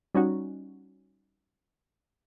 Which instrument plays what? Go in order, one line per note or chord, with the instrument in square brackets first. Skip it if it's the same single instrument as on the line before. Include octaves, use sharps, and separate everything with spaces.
[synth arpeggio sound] G3 C#4 D#4 F#4